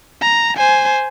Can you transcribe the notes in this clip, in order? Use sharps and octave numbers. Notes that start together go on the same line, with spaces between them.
A#5
C5 G#5